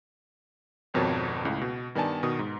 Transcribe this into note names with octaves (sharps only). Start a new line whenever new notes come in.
G#1 F2 B2 A#4 C#5 A5
C#2 A2 C#3
B2
G2 D#3 B3 D5 G#5 A5
B2 D#3 D#6
G#2